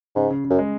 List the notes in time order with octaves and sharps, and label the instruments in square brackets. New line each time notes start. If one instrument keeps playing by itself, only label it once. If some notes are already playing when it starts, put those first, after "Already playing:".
[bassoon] G#2 [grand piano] C#3
[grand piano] C#3
C#3
[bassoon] F#2
[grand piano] G#3